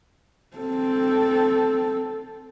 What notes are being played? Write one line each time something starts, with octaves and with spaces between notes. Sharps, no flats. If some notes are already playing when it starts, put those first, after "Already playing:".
C4 A4